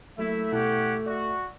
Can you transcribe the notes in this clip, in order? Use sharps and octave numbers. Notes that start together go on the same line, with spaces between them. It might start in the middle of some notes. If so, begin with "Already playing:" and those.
F#3 A3 A#3 E4 E5
B2 E4 G4 A4 C#5 F#5
F#4 D5 E5